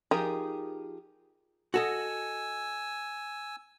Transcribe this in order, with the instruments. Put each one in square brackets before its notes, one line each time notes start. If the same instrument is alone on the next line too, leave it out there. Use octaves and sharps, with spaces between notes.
[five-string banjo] F3 D#4 G4 G#4 A#4
[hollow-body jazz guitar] F#4 A4 D#5 [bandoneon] G#5 E6